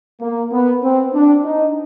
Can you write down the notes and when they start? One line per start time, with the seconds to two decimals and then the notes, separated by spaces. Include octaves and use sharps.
0.21 A#3
0.52 B3
0.82 C4
1.14 D4
1.44 D#4